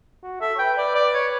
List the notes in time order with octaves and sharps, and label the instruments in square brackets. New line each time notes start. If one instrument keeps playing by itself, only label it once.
[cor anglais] F#4
[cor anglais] A4 [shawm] E5
[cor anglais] C#5
[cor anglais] B4 [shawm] G5
[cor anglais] B4 [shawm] D5
[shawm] D5
C#5